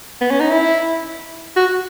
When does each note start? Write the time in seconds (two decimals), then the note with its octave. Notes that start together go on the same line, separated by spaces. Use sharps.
0.21 B3
0.30 C#4
0.40 D#4
0.50 E4
1.56 F#4